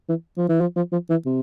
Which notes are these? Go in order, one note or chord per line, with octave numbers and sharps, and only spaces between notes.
E3
F3
E3
F3
F3
F3
E3
C3